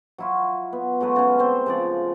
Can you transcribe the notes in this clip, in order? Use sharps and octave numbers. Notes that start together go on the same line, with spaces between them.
F#3 E4 F4
B3
F#3 G#3 A3 B4
C#3 C#4
C4 C5
C#3 F3 D5